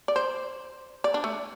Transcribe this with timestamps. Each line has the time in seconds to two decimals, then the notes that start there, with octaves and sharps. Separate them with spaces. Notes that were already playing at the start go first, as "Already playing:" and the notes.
0.08 D5
0.16 C5
1.04 D5
1.14 D4
1.24 A3